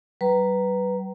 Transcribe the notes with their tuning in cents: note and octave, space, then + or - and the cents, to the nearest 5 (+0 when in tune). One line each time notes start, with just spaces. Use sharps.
G3 -45 B4 +0 A#5 +0